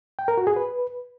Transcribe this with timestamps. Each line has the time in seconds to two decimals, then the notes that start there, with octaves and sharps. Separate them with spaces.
0.19 G5
0.28 A#4
0.37 F#4
0.47 G#4
0.56 B4